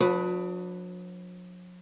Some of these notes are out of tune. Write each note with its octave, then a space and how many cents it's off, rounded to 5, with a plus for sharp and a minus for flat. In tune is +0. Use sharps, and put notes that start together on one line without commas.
F#3 -45 D4 +0 B4 +0